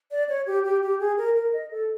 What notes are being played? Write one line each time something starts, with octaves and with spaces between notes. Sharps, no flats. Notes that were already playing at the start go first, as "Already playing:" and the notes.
D5
C#5
G4
G4
G4
G#4
A#4
A#4
D#5
A4